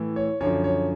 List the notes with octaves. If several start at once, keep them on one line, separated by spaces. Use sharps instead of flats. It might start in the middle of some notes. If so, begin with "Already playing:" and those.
Already playing: A2 E3
C#5
F#2 D3 F3 C#5
C#5